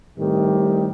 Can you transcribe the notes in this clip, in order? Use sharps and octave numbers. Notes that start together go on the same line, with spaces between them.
A2 D#3 G3 C4 G4